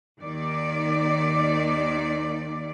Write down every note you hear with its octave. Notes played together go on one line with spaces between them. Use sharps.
D#2 D#3 D5